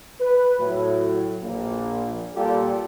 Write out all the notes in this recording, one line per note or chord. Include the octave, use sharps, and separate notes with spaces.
B4
A2 F#3
A#1 A#3
A#2 G3 A#3 F4 G4 A4